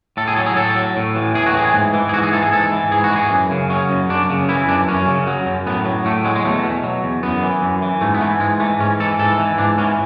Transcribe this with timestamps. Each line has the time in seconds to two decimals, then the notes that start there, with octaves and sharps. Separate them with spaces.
0.17 A2 A4
0.28 G#4
0.36 F#3 A4
0.46 G#4
0.56 A2 A4
0.76 F#3
0.96 A2
1.15 E3
1.35 A2 G#4
1.46 F#4
1.54 E3 G#4
1.74 G#2
1.94 E3
2.09 G#4
2.13 G#2 F#4
2.23 G#4
2.33 E3 A4
2.42 G#4
2.52 G#2 A4
2.72 E3
2.91 G#2 G#4
3.04 F#4
3.12 E3 G#4
3.31 F#2
3.51 C#3
3.70 F#3 C#4
3.90 F#2
4.09 F#2 D4
4.30 C#3
4.49 E3 E4
4.68 F#2 D4
4.88 F#2 C#4
5.07 C#3
5.27 F#3
5.46 F#2
5.67 A2 B3
5.85 F#3
6.05 A2 A3
6.24 F#3 G#3
6.35 G#3
6.45 E2 A3
6.64 B2
6.84 F#3
7.04 E2
7.23 F#2 B3
7.43 E3
7.62 F#2
7.82 E3
8.01 G#2 A3
8.14 B3
8.21 E3 A3
8.40 G#2 G#3
8.60 E3 A3
8.80 G#2 C#4
9.00 E3 A4
9.19 G#2 A4
9.39 E3
9.58 G#2 D4
9.78 E3 C#4